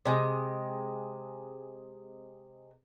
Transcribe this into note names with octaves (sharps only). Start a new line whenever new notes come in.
C3 G#3